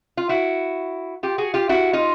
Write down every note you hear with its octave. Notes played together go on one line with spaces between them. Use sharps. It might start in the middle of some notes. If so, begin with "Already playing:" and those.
F4
E4 F#4
F4 G4
F#4 G#4
F4 G4
E4 F#4
D#4 F4